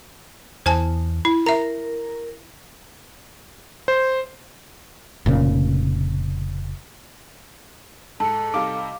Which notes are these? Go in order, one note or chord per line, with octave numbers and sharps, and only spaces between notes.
E2 C5 G#5 A5
E4
A#4 E5 A#5
C5
F1 A#2 C#3
G#2 A4 A5 C#7
C3 G3 D#4 F5 D6